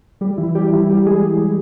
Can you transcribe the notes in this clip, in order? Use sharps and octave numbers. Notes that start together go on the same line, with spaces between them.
G3 G4
E3 E4
G3 G4
E3 E4
G3 G4
G#3 G#4